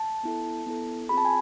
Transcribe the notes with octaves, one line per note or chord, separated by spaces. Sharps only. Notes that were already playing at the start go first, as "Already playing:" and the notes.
Already playing: A5
B3 E4 A4
B3 E4 A4
C4 F4 G#4 B5
A5
G#5